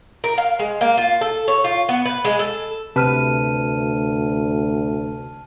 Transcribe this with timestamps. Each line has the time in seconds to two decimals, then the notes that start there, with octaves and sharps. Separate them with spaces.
0.24 A#4
0.38 F5
0.59 G#3
0.81 A#3
0.97 F4
1.21 A4
1.48 C#5
1.64 F4
1.89 B3
2.05 B4
2.25 G#3
2.39 A4
2.96 D2 C3 B4 A5 F6 D#7